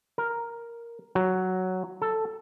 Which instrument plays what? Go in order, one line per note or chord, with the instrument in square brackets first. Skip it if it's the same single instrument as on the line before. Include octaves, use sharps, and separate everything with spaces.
[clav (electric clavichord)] A#4
F#3
A4